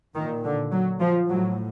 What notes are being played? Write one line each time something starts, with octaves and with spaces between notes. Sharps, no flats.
A#2 D#3
D3
F#3
F3
A2 F#3